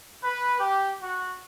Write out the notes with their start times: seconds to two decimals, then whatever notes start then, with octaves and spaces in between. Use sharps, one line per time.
0.23 B4
0.59 G4
1.00 F#4